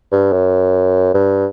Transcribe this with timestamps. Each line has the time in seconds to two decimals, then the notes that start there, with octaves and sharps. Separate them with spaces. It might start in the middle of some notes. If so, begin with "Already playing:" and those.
0.12 G2
0.33 F#2
1.14 G2